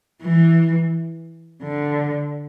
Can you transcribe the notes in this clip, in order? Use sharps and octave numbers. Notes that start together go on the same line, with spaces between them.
E3
D3